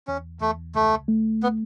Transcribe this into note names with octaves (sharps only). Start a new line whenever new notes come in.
E2 C#4
E2 A3
C#2 A3
A3
B3